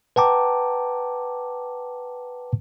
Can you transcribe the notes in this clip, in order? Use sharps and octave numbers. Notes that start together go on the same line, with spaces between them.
B4 F#5 G5 A5 A#5 D6